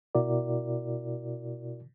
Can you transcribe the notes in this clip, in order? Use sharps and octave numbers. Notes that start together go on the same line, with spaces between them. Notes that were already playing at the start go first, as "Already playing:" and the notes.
B2 E4 F#4 A#4 D5